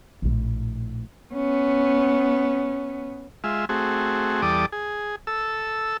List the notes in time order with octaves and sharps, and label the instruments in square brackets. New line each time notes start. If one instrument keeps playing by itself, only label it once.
[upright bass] A#1 A2
[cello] B3 C#4
[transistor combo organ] G#3 F4 E5
A3 C4 F#4 G#4
E2 G3 A4 D5 D6 D#6
G#4
A4 E6